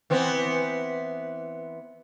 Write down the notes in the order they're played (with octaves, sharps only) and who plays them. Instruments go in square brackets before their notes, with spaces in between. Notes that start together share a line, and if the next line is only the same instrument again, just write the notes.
[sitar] E3 B3 C4